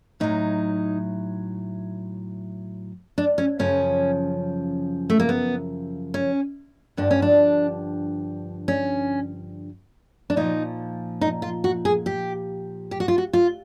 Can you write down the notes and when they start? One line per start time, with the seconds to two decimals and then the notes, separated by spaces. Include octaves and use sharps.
0.20 A2 F#3 D#4
3.18 D4
3.38 C#4
3.59 F#2 C#3 F3 C#4
5.10 A3
5.20 A#3
5.29 B3
6.14 C#4
6.97 G2 D3 F3 D4
7.11 C#4
7.22 D4
8.68 C#4
10.30 D4
10.37 A#2 F3 D#4
11.21 D#4
11.42 F4
11.64 F#4
11.85 G#4
12.06 G4
12.91 G4
13.00 F#4
13.08 F4
13.18 F#4
13.33 F4